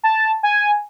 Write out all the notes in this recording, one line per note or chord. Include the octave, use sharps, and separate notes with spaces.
A5
G#5